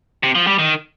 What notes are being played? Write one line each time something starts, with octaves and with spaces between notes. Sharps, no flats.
C3
F3
G3
D#3